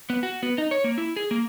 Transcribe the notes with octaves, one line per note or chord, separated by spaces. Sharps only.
B3
F#4
B3
D#4
C#5
A#3
E4
G#4
A#3